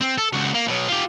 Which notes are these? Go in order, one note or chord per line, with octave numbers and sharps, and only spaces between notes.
C4
A4
C#2 F#4
A#3
B2 F#3
F4 G4